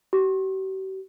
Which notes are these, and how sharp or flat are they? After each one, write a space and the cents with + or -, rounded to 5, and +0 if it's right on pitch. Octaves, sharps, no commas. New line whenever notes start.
G4 -45